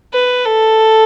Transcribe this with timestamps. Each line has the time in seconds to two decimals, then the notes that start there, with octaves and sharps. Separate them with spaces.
0.14 B4
0.45 A4